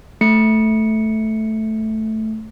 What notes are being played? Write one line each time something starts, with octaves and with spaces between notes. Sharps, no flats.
A3 C#7